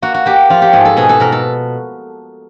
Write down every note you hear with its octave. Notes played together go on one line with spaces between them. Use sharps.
A#3 F#4
F#4
A#3 G4
F3 F4
G4
G#2 G#4
A4
B2 G#4
A4
B2 A#4
A4